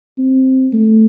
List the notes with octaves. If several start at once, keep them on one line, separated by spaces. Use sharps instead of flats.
C4
A3